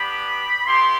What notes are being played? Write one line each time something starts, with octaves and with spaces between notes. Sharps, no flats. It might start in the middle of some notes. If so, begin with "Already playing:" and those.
Already playing: B3 D4 G4 B5
B3 E4 G4 C6